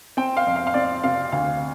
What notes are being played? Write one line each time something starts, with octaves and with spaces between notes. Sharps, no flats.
C4 G5
F5
F2
F5
F5
C4 D5
C3 F5
D2 F5